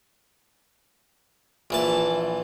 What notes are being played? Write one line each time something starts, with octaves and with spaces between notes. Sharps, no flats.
A#1 E3 A5